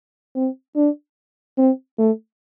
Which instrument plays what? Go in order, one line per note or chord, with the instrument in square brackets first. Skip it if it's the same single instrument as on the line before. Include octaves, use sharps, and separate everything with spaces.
[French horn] C4
D4
C4
A3